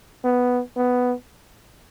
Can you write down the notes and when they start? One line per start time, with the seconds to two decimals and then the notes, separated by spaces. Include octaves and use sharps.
0.24 B3
0.77 B3